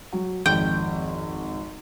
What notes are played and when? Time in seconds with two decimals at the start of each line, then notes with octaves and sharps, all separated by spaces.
0.13 F#3
0.46 G#1 F2 G5